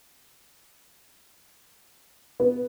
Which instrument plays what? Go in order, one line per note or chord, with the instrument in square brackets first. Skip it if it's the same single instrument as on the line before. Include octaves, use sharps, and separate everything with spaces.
[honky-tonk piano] B3